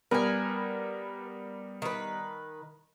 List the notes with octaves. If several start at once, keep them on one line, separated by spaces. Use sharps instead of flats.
G3 B3 A#4 B4 G#5
D#3 B4